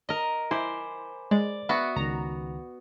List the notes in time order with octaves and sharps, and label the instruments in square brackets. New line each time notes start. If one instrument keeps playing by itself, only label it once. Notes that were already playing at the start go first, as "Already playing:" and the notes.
[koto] A#4 D#5
[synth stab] E4 [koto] C5 [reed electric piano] G#5 B5 D6
[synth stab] G#3 [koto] D5
[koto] B3 F#4 [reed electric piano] E5
[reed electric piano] C#2 D#3 [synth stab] A#5